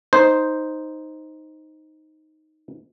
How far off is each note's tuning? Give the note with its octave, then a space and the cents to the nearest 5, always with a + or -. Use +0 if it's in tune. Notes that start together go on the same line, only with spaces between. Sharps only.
D#4 +0 C5 +0